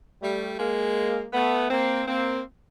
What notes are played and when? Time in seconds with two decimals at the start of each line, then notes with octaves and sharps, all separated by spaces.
0.22 G3 A3
0.59 G#3 A#3
1.33 A3 B3
1.70 A#3 C4
2.08 A#3 C4